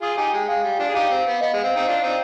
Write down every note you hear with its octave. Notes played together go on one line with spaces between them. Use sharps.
F4 G#4 D#6
D#4 G4 G#5
G#3 G5
G#3 F5
G3
D4 F4
G#4
D#4 G4 F5
C4
B3
B3 D#5
G#3
C4 F5
C4 D#4
D4 F4
C4 D#4